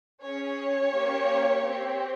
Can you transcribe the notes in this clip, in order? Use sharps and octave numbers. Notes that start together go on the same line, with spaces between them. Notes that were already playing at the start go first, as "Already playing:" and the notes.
C#4 G#4 C#5
A#3 C#4 G4
C4 G4